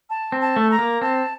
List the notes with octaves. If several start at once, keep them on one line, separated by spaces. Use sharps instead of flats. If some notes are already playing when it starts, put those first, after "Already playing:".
A5
C4
A5
A3
A#5
A#3
C4 A5